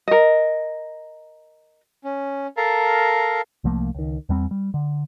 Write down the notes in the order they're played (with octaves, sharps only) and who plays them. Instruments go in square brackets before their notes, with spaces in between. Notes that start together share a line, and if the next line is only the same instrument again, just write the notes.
[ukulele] A#4 D#5
[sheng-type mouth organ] C#4
A4 A#4 F5 A5 A#5
[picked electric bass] C2 F3 A3 A#3
C#2 D#3
E2 G3 C4
G3
D3